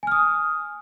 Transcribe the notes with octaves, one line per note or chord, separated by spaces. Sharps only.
G#5 D#6 F6